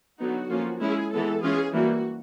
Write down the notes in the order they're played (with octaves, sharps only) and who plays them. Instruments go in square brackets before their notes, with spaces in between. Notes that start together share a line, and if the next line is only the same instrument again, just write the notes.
[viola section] D3 F#3 B3 D#4 F#4
F3 A#3 C#4 F4
G#3 C#4 E4 G#4
E3 G#3 B3 A4
E3 G#3 C#4 F4 G#4
E3 G3 A#3 F#4